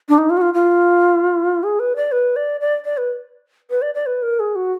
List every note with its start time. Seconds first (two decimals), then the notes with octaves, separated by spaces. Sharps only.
0.09 D4
0.18 D#4
0.30 F4
0.37 F#4
0.41 F4
0.54 F4
1.63 G#4
1.79 B4
1.96 D5
2.12 B4
2.36 D5
2.61 D5
2.85 D5
2.97 B4
3.70 B4
3.82 D5
3.95 D5
4.06 B4
4.22 A#4
4.40 G#4
4.55 F#4